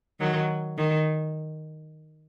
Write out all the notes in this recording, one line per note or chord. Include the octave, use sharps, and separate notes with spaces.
D#3 F#3
D#3